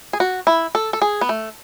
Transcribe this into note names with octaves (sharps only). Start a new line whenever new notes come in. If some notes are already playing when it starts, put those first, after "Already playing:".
G#4
F#4
E4
A4
A4
G#4
B3
A3